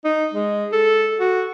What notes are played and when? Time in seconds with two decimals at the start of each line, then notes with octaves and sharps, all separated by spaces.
0.05 D#4
0.34 G#3
0.72 A4
1.20 F#4